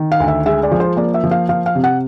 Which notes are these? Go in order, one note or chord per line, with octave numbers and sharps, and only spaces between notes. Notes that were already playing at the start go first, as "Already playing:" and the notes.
Already playing: D#3
F5
D2
E5
G#3 E5
D5
F3
C5
A#3 D5
E5
F3
F5
F3 F5
F5
C3
F#5